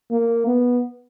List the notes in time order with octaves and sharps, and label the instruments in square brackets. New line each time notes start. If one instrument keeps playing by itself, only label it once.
[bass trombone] A#3
B3